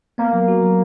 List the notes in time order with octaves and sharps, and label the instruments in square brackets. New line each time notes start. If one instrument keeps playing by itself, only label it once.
[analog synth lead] A#3 [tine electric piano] B3
[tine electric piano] F#3
F#4
F#3